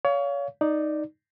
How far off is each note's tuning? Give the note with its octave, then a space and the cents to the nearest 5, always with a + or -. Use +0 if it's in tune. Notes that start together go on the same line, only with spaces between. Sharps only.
C#5 +30 F5 +0
D#4 -5 D5 +5